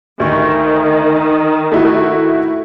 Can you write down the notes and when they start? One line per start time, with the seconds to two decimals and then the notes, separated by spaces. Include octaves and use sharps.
0.20 D2 D#3 C#6
1.72 A3 E4 F#4